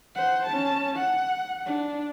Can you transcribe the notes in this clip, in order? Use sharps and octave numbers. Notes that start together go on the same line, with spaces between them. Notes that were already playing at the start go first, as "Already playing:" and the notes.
C5 F#5
C#4 A5
F#5
D4